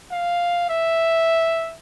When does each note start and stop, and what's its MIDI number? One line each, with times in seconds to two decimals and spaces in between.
0.12 0.68 77
0.70 1.75 76